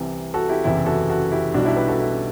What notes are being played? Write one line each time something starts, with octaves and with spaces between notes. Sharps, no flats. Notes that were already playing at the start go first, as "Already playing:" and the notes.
Already playing: C2 C3 E3
F#4 A4
E4 G4
F#1 E2 C3 E3 E4 G4
F#4 A4
F#4 A4
E4 G4
B1 B2 G3 D4 F#4
E4 G4
G4 B4
F#4 A4
E4